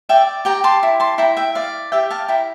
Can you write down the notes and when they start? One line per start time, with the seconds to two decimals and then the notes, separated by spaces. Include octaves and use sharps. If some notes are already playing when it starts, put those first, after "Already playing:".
0.09 D5 E5 G5
0.45 G4 G5 A#5
0.64 A5 C6
0.83 E4
1.00 A5 C6
1.18 E4 G5 A#5
1.37 E5 G5
1.55 D5 F5
1.92 G4 E5 G5
2.10 F5 A5
2.28 E4 G5 A#5